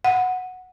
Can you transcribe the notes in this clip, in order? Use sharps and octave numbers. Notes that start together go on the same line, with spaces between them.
F#5